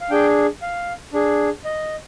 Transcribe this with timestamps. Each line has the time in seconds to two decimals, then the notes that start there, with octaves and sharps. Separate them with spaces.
0.01 F5
0.10 D4 G#4 G5
0.62 F5
1.13 D4 G#4
1.65 D#5